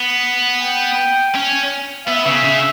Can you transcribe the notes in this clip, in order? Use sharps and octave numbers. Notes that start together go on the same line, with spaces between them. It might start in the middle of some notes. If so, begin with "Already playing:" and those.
Already playing: B3
G5
C#4
B3 E5
C#3
C#3